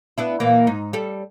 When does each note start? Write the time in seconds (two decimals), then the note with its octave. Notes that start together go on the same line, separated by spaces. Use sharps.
0.18 B3 D4 E4
0.40 A#2 E3 A#3
0.67 G#2 D#4
0.93 G3 A4